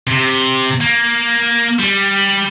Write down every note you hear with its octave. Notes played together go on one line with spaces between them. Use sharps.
C3
A#3
G3